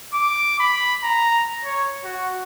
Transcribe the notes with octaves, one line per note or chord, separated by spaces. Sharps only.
D6
B5
A#5
C#5
F#4